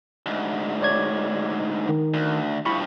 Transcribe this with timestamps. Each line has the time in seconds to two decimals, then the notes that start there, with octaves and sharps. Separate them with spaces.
0.26 D2 G#2
0.82 C#5 D5 G#6
1.89 D#3
2.14 D2
2.66 G2 F3 E4 B5 C#6